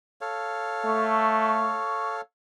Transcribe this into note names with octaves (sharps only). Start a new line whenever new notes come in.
A4 C#5 F5
A3 C#6